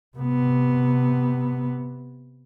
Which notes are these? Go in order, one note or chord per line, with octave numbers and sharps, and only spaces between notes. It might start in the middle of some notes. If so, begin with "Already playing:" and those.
C3 B3